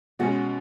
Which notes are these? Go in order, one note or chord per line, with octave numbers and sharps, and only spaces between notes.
B2 G#3 C#4 F#4